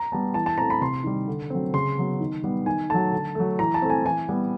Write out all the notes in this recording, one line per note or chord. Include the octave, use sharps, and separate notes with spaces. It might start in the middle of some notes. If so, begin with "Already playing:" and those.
Already playing: A#5
G3 B3 A5
E3 A5
A5
A3 C4 A#5
B5
C3 C6
D#3 G3
D3
F#3 A3 C4
C#3 C6
F#3 B3
D#3
G3 B3
D#3 G#5
F#3 A3 A5
D3
F#3 A3
E3 A#5
A5
A3 C4
G#5
E3 G#5
G3 B3